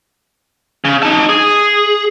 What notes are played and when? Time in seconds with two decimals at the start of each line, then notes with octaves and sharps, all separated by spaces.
0.85 C#3
1.03 D#4 A5
1.29 G#4